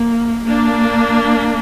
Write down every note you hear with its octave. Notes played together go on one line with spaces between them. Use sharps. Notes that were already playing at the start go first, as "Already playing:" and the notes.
Already playing: A#3
A#3 D4